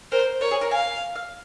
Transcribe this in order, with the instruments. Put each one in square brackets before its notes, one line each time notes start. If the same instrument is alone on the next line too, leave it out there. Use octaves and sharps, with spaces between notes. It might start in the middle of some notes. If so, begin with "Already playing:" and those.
[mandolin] A#4 [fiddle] C5
[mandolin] A#4 [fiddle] C#5
[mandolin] G#4
A#4
[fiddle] F5 [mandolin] G#5
[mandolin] F5